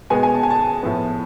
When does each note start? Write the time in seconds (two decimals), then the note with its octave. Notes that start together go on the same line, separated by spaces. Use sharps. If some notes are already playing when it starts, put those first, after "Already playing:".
0.10 B2 G#3 B3 G#5
0.23 G#5
0.34 A5
0.43 G#5
0.50 A5
0.83 A2 F3 B3